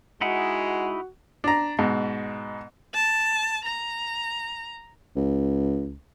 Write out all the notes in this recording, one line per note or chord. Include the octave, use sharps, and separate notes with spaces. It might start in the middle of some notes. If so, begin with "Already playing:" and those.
G#3 D#4 E4 F#4 F#5
D4 A#5
G#2 B2
A5
A#5
C#2